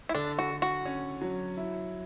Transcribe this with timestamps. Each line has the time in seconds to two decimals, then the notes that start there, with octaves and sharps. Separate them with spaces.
0.09 E4
0.14 D3 D4
0.39 F#4
0.51 D3
0.62 F#4
0.85 C#4
1.21 F#3
1.57 E4